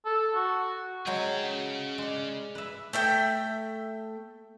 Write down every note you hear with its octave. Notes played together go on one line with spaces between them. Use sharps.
A4
F#4
F#3 G#3 G#4 C#5 G5
C#3
G#3 D5
B4 E5
A3 E5 G5